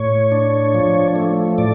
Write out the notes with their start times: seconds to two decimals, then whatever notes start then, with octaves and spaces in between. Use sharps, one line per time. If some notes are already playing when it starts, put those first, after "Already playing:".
Already playing: A2 C#5
0.32 D4
0.74 F3
1.16 A3
1.58 A2 D5